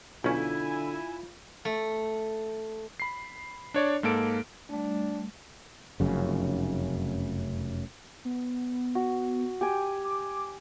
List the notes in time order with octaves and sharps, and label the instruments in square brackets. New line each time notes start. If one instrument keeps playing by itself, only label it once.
[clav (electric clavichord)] B1 C#4 [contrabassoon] D3 [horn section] E4 G#5 [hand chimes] F4
[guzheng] A3
[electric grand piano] B5 C7
D4 C#5 D5
G#2 A#3 A4 D7
[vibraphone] G3 A3 [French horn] D4
[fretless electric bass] F1 F#2 C#3
[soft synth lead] B3
[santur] F#4
G4 G5 G#5
[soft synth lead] D6